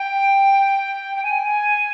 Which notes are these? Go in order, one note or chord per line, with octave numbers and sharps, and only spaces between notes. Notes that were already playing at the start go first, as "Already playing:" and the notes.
Already playing: G5
G5
G#5